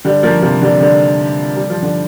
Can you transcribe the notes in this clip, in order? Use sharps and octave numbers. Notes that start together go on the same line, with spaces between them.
D3 G3
F3 A#3
C3 F3
D3 G3
D3 G3
G3
F3
D3